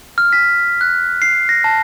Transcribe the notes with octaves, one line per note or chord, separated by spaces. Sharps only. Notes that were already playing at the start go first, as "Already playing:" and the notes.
F6
B6
F#6
C7
A#6
A5